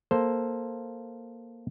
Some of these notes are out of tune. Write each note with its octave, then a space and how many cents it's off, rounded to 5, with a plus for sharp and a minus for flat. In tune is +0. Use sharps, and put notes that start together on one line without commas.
A#3 +0 A4 +0 C5 +0